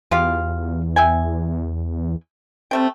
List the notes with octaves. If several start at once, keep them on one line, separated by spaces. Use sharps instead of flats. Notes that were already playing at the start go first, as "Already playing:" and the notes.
E2 F4 G4 F5
E5 G5 G#5
G3 A3 C4 G5